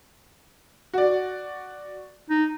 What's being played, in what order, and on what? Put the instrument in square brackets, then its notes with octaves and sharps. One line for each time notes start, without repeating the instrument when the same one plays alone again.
[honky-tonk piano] F#4 D5
[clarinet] D#4